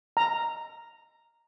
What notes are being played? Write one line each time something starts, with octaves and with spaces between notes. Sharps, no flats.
A#5